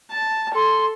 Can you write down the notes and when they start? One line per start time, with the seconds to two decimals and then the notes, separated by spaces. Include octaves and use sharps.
0.11 A5
0.55 A4 C6